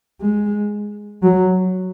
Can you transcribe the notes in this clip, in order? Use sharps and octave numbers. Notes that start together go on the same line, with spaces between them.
G#3
F#3